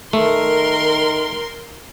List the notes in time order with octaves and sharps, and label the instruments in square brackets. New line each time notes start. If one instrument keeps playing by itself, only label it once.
[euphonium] D#3 [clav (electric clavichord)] A3 [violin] A#4 C6